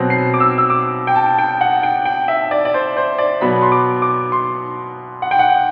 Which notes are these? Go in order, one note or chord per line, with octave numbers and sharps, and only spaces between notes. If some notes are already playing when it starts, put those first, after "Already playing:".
Already playing: B2 F#3 C4
C7
D6
E6
E6
D6
G5
A5
G5
F#5
G5
G5
E5
D5
D5
C5
C5
D5
B2 F#3 B3 B5
C6
D6
D6
C6
F#5
G5
F#5